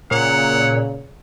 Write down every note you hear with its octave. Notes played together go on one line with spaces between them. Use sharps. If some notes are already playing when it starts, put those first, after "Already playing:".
A#2 C#3 C#5 F#5